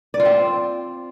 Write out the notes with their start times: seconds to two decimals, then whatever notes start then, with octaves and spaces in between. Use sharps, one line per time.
0.14 D5
0.20 F4
0.25 C4